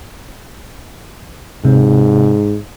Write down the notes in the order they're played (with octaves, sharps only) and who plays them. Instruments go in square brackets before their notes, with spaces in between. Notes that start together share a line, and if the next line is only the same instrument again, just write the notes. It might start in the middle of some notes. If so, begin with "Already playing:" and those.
[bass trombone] G#2 [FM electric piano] C3